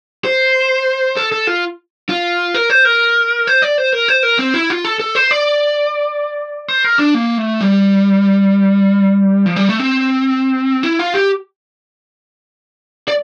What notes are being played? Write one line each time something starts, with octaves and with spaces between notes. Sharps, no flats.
C5
A4
A4
F4
F4
A#4
C5
A#4
C5
D5
C5
A#4
C5
A#4
C4
E4
F4
A4
A4
C5
D5
C5
A#4
D4
A#3
A3
G3
F3
G3
A3
C4
E4
F4
G4
D5